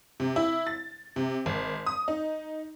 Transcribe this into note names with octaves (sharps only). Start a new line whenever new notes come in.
C3
E4
A6
C3
G#1
D#6
D#4